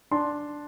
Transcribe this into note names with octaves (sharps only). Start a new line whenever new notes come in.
D4 A5 C6